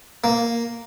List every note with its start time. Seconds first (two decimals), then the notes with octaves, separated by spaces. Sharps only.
0.24 A#3